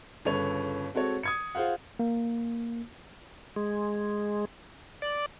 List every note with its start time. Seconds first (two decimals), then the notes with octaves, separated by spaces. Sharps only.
0.25 G1 C#3 A4 B4 C#5 F7
0.94 G#3 C4 F#4 A4 C#5
1.23 D#6 G#6 C#7
1.55 F4 G#4 C5 F5 F#5
1.99 A#3
3.56 G#3
5.02 D5